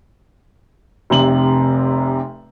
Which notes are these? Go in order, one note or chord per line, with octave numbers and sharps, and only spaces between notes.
F1 C3 F#7